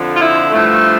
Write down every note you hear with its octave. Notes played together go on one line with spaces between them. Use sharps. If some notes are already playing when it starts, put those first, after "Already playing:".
Already playing: F2 D3 F3
F4
E4
G2 F3 A3